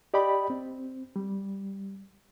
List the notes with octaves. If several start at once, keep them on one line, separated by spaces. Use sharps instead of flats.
G4 D5 D#5 G5 B5
C4
G3